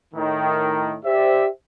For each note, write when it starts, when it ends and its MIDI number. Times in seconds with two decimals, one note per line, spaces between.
0.14 0.95 45
0.14 0.95 51
1.05 1.47 67
1.05 1.47 72
1.05 1.47 74
1.05 1.47 76